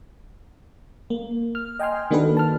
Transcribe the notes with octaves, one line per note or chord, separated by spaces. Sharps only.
A#3
F6
D#5 G5 G#5 C6 F6
D#3 A#3 D4 F#4 A4 B4
A5 F6